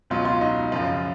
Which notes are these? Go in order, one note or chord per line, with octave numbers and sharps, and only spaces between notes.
C#2 B2 F#3 F4
F4
D#4
F#2 C#3 F3 F4